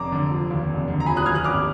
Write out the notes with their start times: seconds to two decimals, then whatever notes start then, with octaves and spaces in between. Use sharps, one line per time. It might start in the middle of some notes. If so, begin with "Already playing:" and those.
Already playing: F1 A#5 D6
0.12 D3
0.31 F3
0.50 D#2
0.69 F1
0.88 D3
1.00 A#5
1.06 F3 G#5 B5
1.16 D#6 F#6
1.25 D#2 F6 G#6
1.35 D#6 F#6
1.44 G#1 D6 F6